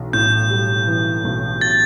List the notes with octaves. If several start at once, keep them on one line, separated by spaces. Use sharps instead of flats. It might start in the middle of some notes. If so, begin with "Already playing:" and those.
Already playing: B1 E3
A2 G6
G3
E3
B1
A6